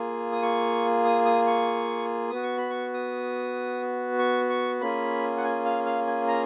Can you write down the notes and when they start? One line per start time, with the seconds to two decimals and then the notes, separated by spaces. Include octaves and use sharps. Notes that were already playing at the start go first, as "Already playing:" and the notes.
Already playing: A#3 F4 G#4
0.32 D#6
0.42 C#6
1.05 D#6
1.25 D#6
1.46 C#6
2.31 B3 F#4 D#6
2.43 C#6
2.57 B5
2.70 C#6
2.94 D#6
4.19 C#6
4.49 C#6
4.81 A#3 C#4 F4 G#4 B5
5.37 F#5
5.44 G#5
5.65 F5
5.86 F5
6.07 G#5
6.27 A#5